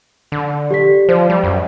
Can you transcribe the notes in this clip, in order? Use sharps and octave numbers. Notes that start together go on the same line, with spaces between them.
D3
G4 D5 B6
F3 C5 D5
G3
F#2